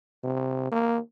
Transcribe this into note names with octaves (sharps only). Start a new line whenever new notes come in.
C3
A#3